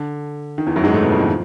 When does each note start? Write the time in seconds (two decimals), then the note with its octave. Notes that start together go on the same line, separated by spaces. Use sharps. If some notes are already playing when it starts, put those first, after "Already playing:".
Already playing: D3
0.58 D#3
0.67 E2 E3
0.76 F#2 F#3
0.84 G#2 G#3
0.93 A2 A3
1.02 B2 B3
1.11 F2 F3
1.19 D#3
1.28 F3